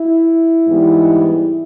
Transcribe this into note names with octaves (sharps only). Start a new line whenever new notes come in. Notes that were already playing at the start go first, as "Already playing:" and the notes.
Already playing: E4
G#2 E3 G3 B3 D#4